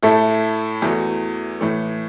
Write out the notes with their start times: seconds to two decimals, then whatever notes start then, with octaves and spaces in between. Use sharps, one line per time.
0.03 A2 A3 E4 A4
0.82 E2 E3 A3 F#4
1.61 A2 E3 A3